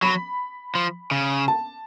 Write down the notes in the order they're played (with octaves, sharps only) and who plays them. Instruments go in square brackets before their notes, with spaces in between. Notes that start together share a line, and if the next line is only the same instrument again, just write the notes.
[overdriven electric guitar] F#3 [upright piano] B5
[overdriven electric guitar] F3
C#3
[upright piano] A5